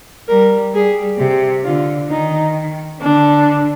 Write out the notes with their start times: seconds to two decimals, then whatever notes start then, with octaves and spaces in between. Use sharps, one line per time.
0.28 G3 A#4
0.74 G3 G#4
1.19 C3 G4
1.64 D3 F4
2.09 D#3 D#4
3.01 D3 D4